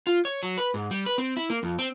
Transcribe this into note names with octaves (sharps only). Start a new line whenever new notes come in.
F4
C#5
F#3
B4
G#2
G3
B4
C4
E4
A#3
F2
C4